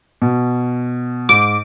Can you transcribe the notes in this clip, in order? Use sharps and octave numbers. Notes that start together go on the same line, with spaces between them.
B2
G#2 D6